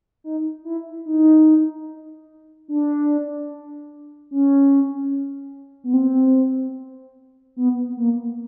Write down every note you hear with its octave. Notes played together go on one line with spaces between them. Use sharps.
D#4
E4
D#4
D4
C#4
B3
C4
B3
A#3